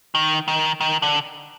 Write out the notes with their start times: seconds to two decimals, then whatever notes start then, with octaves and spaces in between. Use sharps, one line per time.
0.15 D#3
0.48 D#3
0.81 D#3
1.02 D3